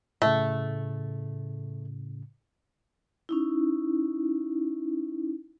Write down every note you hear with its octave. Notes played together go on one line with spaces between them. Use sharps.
A2 C#3 A3
C#4 D#4 E4